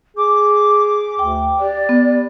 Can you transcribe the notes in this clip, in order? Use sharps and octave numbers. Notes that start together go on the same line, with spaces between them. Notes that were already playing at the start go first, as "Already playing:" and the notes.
G#4 D6
D2 G5
G4 D5
B3